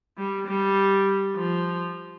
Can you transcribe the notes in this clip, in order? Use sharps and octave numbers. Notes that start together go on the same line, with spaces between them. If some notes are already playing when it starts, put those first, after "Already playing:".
G3
G3
F3